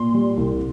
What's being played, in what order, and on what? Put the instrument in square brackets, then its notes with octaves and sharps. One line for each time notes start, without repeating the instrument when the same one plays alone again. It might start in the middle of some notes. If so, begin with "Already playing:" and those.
Already playing: [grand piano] A#2 [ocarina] C6
[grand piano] G3
C2